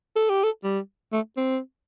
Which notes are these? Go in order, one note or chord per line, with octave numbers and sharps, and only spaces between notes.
A4
G4
A4
G3
A3
C4